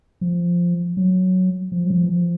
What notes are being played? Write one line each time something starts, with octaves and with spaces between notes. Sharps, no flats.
F3
F#3
F3
F#3
F3
E3
F3